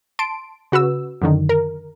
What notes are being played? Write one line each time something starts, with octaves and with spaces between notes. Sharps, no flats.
A5 C6 D7
C#3 F#4 B4 E6
F#2 D3 D#3
A#4